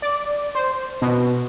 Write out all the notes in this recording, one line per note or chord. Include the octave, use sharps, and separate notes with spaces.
D5
C5
B2